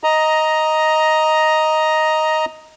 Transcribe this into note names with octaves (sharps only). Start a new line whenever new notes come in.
D#5 A#5